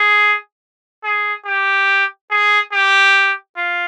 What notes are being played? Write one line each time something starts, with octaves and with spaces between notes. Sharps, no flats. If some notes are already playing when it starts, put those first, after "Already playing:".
Already playing: G#4
G#4
G4
G#4
G4
F4